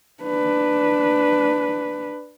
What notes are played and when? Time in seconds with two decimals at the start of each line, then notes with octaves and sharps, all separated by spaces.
0.23 D4 B4